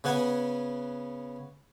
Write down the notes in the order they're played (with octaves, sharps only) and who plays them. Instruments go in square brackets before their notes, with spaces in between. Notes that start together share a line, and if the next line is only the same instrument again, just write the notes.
[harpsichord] C#3 B3 F#5 G#5